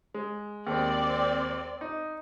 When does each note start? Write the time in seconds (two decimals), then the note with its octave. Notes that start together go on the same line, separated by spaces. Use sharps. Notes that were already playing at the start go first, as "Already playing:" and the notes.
0.14 G#3
0.67 D#2 G#3 C4 D5
1.81 D#4